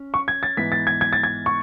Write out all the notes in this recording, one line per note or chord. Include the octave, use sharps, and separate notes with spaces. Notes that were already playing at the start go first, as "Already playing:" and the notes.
Already playing: C#4
C#6
G#6
A6
G#2 E3 B3 B6
A6
G#6
G#6
A6
G#6
C#6